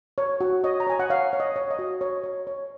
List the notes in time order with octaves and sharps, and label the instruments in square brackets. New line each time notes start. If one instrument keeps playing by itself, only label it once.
[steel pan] C#5
F#4
C#5 D#5
A#5
C#5 G#5
F#5
C#5 F5
C#5
D#5
C#5
D#5
F#4
C#5
C#5
C#5